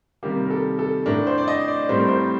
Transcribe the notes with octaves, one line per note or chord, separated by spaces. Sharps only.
C3 D#3 G3 A#3 G4
A#4
A4
A4
A2 A3 D4 A#4
C5
D5
D#5
D5
A2 G3 C4 C5
A#4
C5